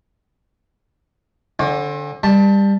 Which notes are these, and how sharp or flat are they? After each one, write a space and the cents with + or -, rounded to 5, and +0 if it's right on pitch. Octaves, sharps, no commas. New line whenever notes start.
D3 -5 C4 +45
G3 +20 A5 +0